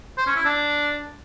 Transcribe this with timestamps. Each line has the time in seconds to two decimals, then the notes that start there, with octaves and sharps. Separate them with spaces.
0.17 C5
0.26 C#4
0.36 E4
0.45 D4